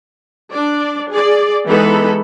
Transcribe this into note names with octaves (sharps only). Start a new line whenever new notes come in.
D4 D5
G#4 D5
E3 G#3 B3 D#4 A4 B5